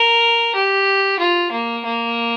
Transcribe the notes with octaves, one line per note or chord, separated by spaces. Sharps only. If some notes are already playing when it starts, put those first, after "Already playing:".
Already playing: A#4
G4
F4
A#3
A#3